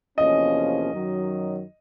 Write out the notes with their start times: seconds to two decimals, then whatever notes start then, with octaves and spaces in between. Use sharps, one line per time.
0.17 E2 C3 F3 A#3 C#4 D#5
0.91 F#2 D#3 F#3